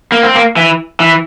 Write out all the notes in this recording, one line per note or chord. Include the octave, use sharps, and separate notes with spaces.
A#3
C4
A#3
E3
E3